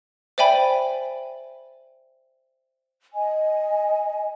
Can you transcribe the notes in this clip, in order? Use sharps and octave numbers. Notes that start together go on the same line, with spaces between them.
C5 D5 E5 G5 G#5 B5
D#5 G#5